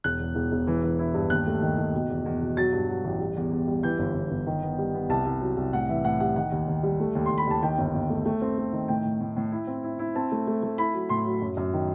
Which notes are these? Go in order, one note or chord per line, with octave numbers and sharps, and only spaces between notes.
E1 F#6
E2
E1
E1
E3
E3
E4
G2
D#2 F#6
A3
D#3
D#3
B2
E2
E2
B2
F#3 A6
G2
F#3
A1
G3
E2
E2
G3
E3 G6
G1
G1
G1
D#3
B3
G3
B3
C2 A5
C2
F#3
C2
A2 F#5
E3 E5
A2 F#5
G3 F#5
D#3 F#5
D#2
D#2
G3
A3
D#2
D#2 C6
B5
D#2 A5
D#3 G5
G1
G1
A3
A3
C4
A3
D#3
A2 G5
A2
A2
A2
E4
C4
E4
E4
C4 A5
A3
A3
A3
E4 B5
F#3
A2 C6
F#3
F#2
F#2
D#3